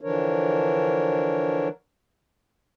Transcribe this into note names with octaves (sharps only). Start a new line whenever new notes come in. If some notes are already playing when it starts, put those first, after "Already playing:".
D3 E3 F3 D4 A#4 C#5